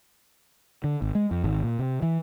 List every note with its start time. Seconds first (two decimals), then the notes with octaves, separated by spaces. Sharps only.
0.84 D3
1.02 G#1
1.15 G#3
1.31 F2
1.44 G#1
1.63 A#2
1.79 C3
2.02 E3